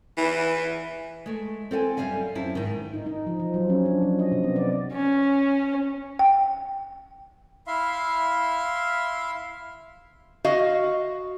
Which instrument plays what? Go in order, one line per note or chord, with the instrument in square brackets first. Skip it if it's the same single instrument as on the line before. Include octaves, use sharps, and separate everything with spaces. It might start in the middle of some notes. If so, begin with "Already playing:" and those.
[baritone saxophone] E3
[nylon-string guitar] G#3 A3
C4 A4 F5 G#5
F#2 F#3 G3 E5 F5 G#5
F#2 C4 E4 A5
G#2 D#3
[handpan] D#4
D#4
F3
F3
F#3
C#4
D4
F3
D#5
C3
B3
D5
[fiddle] C#4
[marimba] G5
[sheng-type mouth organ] E4 E5 F5 C6
[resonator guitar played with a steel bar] F#4 D#5 F5